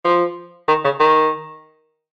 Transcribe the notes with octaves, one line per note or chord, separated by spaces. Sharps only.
F3
D#3
C#3
D#3